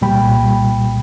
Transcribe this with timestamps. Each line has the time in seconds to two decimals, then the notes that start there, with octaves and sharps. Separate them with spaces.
0.01 C2 A#2 G3 G5 B5